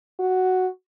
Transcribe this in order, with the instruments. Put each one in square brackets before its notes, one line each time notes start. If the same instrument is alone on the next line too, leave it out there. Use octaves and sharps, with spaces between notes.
[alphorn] F#4